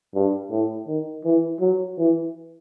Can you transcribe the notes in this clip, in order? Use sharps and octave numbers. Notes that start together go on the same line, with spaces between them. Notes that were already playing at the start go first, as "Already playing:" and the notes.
G2
A2
D#3
E3
F#3
E3